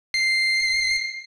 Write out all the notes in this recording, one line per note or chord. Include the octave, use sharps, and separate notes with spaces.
C7